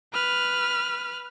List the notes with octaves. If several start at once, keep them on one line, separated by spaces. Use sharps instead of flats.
B4 F6